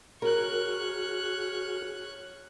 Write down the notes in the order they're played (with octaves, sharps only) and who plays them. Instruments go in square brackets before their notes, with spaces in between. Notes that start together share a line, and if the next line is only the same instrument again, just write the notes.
[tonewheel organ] F#4 G#4 F6 [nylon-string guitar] A#4 [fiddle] C#5 F#6